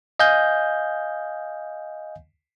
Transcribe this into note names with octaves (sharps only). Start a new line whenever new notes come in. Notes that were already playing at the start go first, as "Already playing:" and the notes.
D#5 F5 G#5 G6